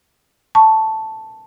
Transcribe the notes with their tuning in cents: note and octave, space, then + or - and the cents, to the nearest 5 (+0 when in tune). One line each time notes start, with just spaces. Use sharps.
A5 +0 C#6 +0